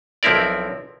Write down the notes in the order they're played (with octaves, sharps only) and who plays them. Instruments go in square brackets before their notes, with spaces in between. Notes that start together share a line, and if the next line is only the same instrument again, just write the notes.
[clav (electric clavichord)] B1 F3 C4 E4 A#4 D5